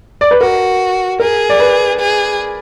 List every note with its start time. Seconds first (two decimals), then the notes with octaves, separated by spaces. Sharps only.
0.21 D5
0.31 B4
0.41 F#4 A#4
1.20 G#4 A#4
1.50 D5
1.60 B4
2.00 G#4